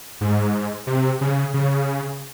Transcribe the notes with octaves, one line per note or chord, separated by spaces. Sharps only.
G#2
C3
C#3
C#3